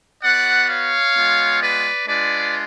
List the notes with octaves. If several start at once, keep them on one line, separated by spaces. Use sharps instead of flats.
B3 F#4 D5 F#5
C#5 F5
G#3 B3 F4
B4 D5
G#3 D4 F4 B4 D5